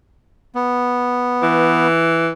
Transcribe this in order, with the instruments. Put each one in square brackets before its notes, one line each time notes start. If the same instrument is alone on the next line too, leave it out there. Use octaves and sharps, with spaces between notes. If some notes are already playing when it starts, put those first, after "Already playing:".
[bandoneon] B3
[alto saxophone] E3